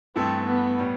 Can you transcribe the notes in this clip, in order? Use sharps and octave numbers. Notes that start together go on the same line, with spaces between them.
G2 E3 A3 C4 E4 A4
B3
A2 G3 B3